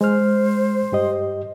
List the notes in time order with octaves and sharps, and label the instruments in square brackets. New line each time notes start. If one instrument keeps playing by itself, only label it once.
[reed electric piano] G#3 F6 [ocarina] C5
[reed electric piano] G2 G4 D#5